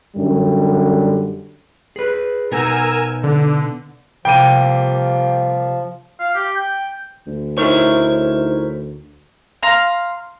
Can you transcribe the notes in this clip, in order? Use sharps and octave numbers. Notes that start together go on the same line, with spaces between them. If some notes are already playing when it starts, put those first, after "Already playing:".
F#2 D3 G3
G#4 B4
B2 B3 D#4 A#4 G#5 E6
D3
C2 F3 G3 A#3 G5 D#7
F5
G4
G5
D2
D#4 E4 A#4 C5 C#5
F5 A#5 C6 F6